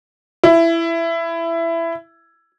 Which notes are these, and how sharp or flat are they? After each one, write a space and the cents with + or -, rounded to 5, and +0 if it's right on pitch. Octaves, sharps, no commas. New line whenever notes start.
E4 +15